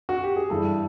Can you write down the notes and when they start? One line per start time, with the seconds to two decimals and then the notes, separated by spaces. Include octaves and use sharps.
0.09 F#4
0.23 G4
0.36 G#4
0.50 G2 E3 G3 A4